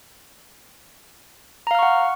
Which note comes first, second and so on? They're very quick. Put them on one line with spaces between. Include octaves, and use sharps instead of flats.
A#5 F5 F6 C#6 F#5